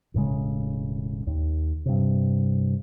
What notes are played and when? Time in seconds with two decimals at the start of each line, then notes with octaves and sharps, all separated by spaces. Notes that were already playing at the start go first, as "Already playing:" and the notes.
0.14 E1 A2 C#3 G#3
1.27 D#2
1.86 G2 C3